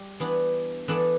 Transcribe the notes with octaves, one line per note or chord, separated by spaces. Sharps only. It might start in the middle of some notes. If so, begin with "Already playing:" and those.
Already playing: G3 G4
E3 B3 D4
E3 B3 D4 A4 D5